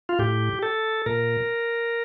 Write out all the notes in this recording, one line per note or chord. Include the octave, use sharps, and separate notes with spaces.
F4
A2 G4
A4
A#2 A#4